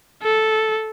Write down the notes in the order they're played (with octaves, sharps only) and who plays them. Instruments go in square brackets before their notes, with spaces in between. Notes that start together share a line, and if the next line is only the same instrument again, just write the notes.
[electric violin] A4